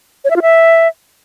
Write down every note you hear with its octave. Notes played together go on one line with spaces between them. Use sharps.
C#5
E5
F4
E5